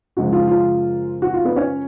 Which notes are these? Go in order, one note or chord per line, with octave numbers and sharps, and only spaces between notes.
F#2 C#3 F3 G#3 F#4
F4
F4
F#4
F4
B3 B4
C#4 C#5